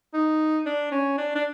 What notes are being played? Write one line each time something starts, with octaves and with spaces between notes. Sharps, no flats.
D#4
D4
C#4
D4
D4